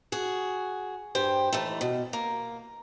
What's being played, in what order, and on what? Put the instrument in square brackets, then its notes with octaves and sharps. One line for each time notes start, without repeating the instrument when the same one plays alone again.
[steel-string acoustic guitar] F#4 G#4
G2 G4 C5
D#2 E3 A3
B2
A#3